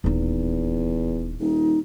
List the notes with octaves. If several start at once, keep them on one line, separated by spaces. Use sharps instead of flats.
D#1 E2 D#4
D#1 D#4